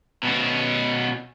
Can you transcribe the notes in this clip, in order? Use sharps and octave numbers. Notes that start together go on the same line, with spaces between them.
B2 C#4